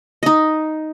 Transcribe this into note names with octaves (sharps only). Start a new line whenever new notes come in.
D#4 D#5